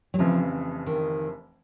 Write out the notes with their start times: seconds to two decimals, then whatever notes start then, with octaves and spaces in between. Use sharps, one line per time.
0.14 F#3
0.19 F1 F2 C#3 E3 F3
0.86 D#3